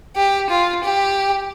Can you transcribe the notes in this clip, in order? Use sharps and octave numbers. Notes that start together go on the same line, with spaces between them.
G4
F4
G4